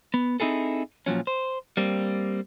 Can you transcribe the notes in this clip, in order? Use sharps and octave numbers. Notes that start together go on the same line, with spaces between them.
B3
C4 D#4 E4 G#4 A4
A#2 F3 F#3 C#4
C5
G3 A#3 C4